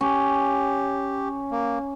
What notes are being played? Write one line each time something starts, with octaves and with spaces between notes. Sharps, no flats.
C#4 G4
A#3